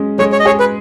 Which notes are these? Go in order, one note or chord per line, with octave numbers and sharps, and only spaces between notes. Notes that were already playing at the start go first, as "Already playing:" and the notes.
Already playing: G#3 C#4
G#3 C#5
C#5
D#5
G#4 C#5
B4